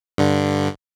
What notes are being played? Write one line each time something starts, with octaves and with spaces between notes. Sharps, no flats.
G2 D3